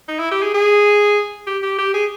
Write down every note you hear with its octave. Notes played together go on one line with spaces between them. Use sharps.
D#4
E4
G4
G#4
G#4
G4
G4
G4
G#4